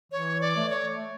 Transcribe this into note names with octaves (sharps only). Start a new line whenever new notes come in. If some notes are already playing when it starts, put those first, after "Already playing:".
E3 C#5
D5
A3
C#5